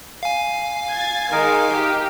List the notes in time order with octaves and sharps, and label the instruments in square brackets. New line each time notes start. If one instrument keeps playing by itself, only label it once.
[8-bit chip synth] F5 G#5
[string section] G#6 A6
[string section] D#3 G#3 [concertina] D#4 A#4
[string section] G4